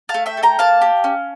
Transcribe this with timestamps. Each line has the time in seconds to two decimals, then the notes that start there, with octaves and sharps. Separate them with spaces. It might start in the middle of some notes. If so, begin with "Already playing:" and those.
0.09 F5 A5
0.14 A3
0.26 E5 G5
0.37 A4
0.43 G5 A#5
0.59 A#3 F5 A5
0.81 G4
1.04 C#4